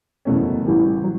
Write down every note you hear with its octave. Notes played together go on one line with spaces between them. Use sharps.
F#1 E2 B2 A3 C#4
A1 A2 E3 G3
F#3